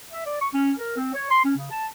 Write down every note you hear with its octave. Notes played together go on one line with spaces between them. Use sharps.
E5
D5
C#6
C#4
A#4
C4
C#5
C6
C#4
C#3
A5